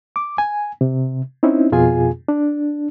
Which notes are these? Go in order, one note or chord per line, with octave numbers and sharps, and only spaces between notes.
D6
G#5
C3
C4 C#4 D#4 E4
F2 B2 F4 G#4 G#5
D4